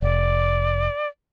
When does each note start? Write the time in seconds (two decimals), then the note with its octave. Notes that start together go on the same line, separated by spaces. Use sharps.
0.02 F1 D5